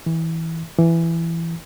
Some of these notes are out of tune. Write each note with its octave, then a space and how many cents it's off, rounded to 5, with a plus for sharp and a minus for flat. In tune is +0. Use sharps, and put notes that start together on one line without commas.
E3 -20
E3 +10